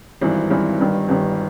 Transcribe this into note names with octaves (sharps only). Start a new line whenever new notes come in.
G#1 G2 E3
G#1 G2 E3
G1 G2 D#3
G1 G2 D#3